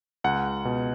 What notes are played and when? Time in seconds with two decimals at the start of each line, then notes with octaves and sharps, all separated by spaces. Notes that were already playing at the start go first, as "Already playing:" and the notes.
0.24 C#2 F#5
0.65 B2